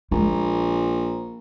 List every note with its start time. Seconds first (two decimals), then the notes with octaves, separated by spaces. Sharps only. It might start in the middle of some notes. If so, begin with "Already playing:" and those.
0.11 A#1 G#3 A#3